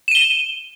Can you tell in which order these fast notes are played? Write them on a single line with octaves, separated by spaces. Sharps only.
E7 D#7 G7